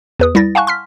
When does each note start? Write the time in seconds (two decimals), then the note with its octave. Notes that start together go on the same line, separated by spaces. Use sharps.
0.19 E2 B4 D#6
0.35 G3 E4 A6 A#6
0.55 F5 F#5 G#5 A5 C#6 F#6
0.67 C6 F6 B6